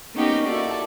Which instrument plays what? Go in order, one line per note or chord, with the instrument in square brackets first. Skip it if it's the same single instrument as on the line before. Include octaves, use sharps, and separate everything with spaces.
[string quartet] A#3 B3 C#4 D#4 F#4 G4
E4 F#4 A4 D5